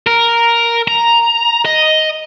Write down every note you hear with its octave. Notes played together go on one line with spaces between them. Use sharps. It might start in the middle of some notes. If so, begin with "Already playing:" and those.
A#4
A#5
D#5